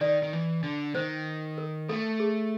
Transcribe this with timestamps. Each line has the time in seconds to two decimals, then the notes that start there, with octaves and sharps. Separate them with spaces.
0.01 D#3 D5
0.23 D#3
0.33 E3
0.63 D3
0.95 D#3 C5
1.58 A#4
1.89 A3 A4
2.20 G#4